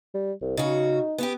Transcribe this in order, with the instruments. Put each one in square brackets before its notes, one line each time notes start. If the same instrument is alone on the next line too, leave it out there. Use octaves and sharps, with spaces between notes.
[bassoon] G3
C2
[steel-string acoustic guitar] C#3 F#4 [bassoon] D#4
[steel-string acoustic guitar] B3 F#4 G4